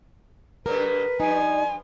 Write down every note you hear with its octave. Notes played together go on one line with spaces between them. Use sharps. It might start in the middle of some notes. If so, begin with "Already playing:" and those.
F#2 C#3 A#3 A#4 B4
G2 F3 D#4 G#5